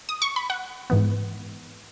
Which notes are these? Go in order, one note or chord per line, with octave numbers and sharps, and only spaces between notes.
D#6
C#6
B5
F#5
G#2 E3 B3